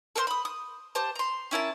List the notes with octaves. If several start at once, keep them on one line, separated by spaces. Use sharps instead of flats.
A4 A#4 C5 C6
B5 D#6
D#6
G4 C5 A5
A#5 C6
C#4 E4 A#4 A5